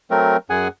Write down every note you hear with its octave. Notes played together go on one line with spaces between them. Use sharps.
F#3 A3 C4 A#4
F#2 G#4 F#5 G#5